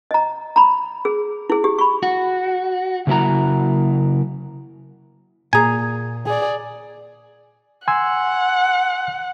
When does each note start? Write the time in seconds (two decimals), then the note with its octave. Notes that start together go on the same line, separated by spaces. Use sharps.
0.11 D#5 A#5
0.56 A#5 B5
1.05 G#4
1.50 E4 G#4
1.64 G4
1.79 B5 C#6
2.03 F#4
3.07 C#3 F#3 A#3 E4 F#4 A#5
5.53 A#2 G#4 G#5 A#5
6.26 G#4 D5
7.88 F#5 G#5 C6 E6